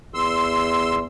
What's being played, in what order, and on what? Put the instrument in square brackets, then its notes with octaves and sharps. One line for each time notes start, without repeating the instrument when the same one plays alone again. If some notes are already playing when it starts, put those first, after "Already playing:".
[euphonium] E2 [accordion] C6 E6